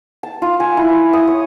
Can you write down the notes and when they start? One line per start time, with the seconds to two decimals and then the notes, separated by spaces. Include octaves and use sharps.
0.23 A5
0.42 F4
0.60 G#5
0.77 E4
1.13 D#6
1.27 C#5